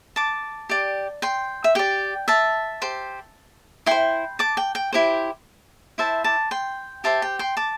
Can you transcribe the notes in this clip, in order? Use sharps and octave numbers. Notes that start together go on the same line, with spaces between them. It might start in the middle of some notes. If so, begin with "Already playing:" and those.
A5 D6
G4 D5
G5 C6
E5
G4 D5 G5
E5 A5
G4 C5
E4 C5 G5 C6
A5 D6
G5
G5
E4 G4 C5
E4 C5 E5 A5
A5 D6
G5 C6
G4 C5 E5 A5
G5
G5 C6
A5 D6